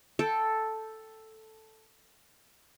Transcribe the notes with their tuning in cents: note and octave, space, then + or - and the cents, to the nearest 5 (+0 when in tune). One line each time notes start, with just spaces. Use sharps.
A4 +0 G5 +0